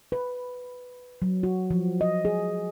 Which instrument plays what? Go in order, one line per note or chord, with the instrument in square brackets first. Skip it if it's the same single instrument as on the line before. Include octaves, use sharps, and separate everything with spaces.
[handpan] B4
F#3
F#4
F3
D#5
G#4